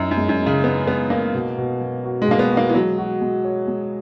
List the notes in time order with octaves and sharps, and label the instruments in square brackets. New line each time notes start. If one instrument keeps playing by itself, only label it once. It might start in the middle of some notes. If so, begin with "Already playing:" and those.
Already playing: [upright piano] F#2 [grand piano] D#4 E4
[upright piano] F#2
[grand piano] G#3
[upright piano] F#2
[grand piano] D#4
[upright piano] C#3
[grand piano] G#3 [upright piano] B3
[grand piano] G#3 [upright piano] B3
[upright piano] A#3 [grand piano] A#4
[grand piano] B2
B2
F#3
F#4
[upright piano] G#3
[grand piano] B2 [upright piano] A#3
[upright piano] B3
[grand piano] F#4
[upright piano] A#3
E3
[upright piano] F#3 [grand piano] G#3
[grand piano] F#4
G#3
C#5
G#3